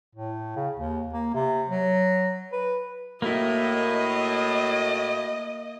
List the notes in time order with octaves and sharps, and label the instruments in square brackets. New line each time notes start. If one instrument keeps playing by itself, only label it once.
[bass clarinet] A2
C#3
D#2
A#3
C3
F#3
B4
[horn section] A2 [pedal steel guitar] A#3 E4 [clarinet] F#4 [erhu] D#5